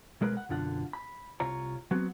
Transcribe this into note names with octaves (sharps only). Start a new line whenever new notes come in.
B1 G#3 A#4 B4 B5
F#5
B1 F#2 D3 F4 F#5
B5
C2 F4 C#5 A#5
F#3 B3 C4 F#4